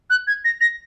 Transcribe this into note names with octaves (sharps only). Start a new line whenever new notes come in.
F#6
G#6
A#6
A#6